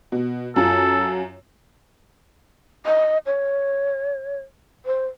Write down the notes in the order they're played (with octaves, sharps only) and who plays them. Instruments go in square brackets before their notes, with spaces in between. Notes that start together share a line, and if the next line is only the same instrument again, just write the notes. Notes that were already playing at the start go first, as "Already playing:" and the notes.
[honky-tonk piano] B2
[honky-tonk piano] F#2 F4 [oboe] A4
[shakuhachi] D#5
C#5
C5